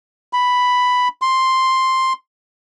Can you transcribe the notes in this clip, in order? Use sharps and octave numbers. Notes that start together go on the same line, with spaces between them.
B5
C6